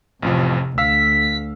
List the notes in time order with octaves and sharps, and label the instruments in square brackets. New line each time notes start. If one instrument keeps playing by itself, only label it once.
[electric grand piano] A1 F2 F3 [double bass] C3
[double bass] D2 [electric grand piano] F5 E6 [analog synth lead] B6